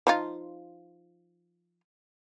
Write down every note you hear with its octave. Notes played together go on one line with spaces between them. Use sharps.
F3 D#4 F4